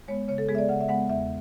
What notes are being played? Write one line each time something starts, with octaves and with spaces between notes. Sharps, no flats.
G#3 B3 C#5
C#3 C#5
A4
G#3 B3 G#4
E5
D5
C#3 F#5
E5
G#3 B3 F#5
E2 E5